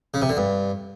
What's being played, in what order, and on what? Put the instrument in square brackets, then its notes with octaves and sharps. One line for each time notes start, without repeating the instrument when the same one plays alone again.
[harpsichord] C#3
C3
D3
G2